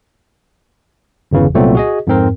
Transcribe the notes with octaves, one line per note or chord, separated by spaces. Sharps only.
G1 E2 C#3 E3
C2 A#2 F#3 A3 B3 C4
F#4 G#4 D#5
F2 G#2 C4 A#4